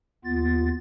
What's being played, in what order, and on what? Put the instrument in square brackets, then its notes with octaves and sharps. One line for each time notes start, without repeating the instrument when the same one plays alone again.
[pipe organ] D#2 B3 F4 A6